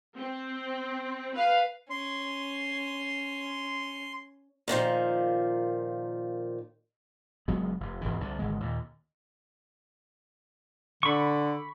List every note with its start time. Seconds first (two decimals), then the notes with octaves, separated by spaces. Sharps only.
0.16 C4
1.35 B4 F5
1.90 C#4 C6
4.68 A#2 D3 D#3 F3
7.48 F#1 F#3 G#3 B3
7.80 F1
8.01 E1 G#2 E3
8.21 C2 D3
8.39 G#1 D3 G#3
8.60 D#2 A#2
11.03 D3 B5 C#6